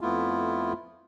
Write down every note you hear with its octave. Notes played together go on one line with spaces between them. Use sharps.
F2 A3 B3 E4 F4